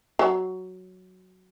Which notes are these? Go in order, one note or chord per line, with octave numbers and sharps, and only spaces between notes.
F#3